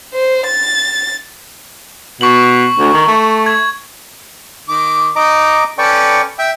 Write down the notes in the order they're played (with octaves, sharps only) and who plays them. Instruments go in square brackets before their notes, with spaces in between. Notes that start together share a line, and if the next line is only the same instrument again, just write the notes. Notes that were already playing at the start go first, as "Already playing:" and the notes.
[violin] C5
A6
[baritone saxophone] B2 [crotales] C#6 F#7
[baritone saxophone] D2
D#3
A3
[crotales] G#6
[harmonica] D#3 D6
[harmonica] D#4 [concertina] D#5 A#5 D6
[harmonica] C#4 A4 B4 [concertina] D5 G5 C#6
[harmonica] E5 [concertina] G5